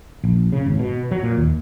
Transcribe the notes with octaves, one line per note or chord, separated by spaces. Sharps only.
A#1
C#3
G#1
B2
F#3
A#2
D#2